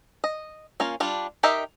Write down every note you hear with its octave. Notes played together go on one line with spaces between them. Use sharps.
D#5
A#3 C#4 F4
G3 D4 F4
D#4 G4 A#4 D#5 E5